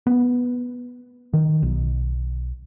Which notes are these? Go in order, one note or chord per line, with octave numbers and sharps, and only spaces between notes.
B3
D#3
B1